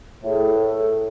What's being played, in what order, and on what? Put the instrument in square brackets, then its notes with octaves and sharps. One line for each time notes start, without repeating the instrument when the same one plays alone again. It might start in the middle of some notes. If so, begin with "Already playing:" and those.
[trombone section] A2 [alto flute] G#4
[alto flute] B4
A4